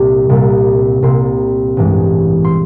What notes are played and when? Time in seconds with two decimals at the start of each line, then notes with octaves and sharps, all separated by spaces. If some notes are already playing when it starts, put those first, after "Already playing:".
Already playing: C2 A#2 G3 A#3
0.29 C2 A#2 G3 A#3
1.02 C2 A#2 G3 A#3 C6
1.77 A1 G2 E3 G#3
2.44 C6